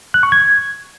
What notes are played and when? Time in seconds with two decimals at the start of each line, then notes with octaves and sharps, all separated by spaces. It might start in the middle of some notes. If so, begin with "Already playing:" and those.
0.14 F#6
0.23 C#6
0.32 G#6